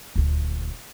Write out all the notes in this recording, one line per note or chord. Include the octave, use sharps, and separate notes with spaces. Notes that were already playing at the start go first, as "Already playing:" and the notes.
D#1 D2